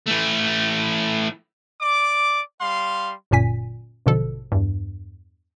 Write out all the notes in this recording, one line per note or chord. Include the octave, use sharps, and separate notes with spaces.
E3 A3
D5 D6
G3 F5 C6
G1 F#2 A#2 G#5 B6
A1 G2 B2 D3 F3 A4
E2 G2